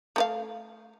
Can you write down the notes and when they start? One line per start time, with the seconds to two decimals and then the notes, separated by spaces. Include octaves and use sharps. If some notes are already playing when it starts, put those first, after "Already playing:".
0.16 A3 A#4 F5